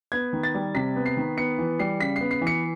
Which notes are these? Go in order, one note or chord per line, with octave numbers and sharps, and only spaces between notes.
B3 G#6
D#3
A6
G3
C3 B6
B3
C7
D#3
B3 C#7
E3
G3 C7
C#3 B6
B3 C7
C7
E3
C#7